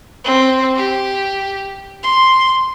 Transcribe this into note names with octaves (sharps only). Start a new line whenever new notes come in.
C4
G4
C6